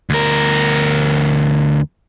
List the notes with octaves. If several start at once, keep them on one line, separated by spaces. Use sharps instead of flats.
D2 A#4